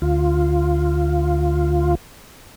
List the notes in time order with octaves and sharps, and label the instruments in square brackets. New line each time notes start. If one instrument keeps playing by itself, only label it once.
[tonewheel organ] D2 F4